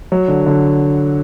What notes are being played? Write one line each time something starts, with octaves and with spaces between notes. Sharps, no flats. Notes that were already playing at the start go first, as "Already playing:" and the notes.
F#3
D3
D3